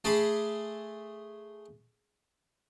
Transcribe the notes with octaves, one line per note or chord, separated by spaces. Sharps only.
A3 G#4 A5 B5 C6 D6